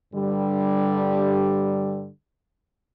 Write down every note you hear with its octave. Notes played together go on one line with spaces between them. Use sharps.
G2 D3 G3